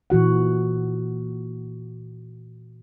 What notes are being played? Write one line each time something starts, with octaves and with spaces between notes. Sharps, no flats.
A#2 E3 F#4 F#5